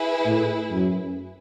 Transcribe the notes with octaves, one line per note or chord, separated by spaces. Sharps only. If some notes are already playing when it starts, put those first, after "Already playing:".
Already playing: E4 G#4 B4
A2
F#2